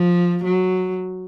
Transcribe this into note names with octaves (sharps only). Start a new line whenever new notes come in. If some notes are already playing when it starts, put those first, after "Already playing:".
Already playing: F3
F#3